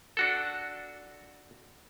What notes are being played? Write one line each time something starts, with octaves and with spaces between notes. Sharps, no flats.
D4 F#4 A4